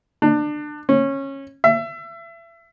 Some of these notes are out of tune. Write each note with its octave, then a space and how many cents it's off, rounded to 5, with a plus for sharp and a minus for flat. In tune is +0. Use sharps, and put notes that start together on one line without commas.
D4 +25
C#4 -20
E5 +30